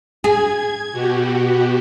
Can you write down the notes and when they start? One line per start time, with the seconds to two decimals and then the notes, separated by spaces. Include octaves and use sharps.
0.24 G#4 G#6
0.92 B2 F#4 G4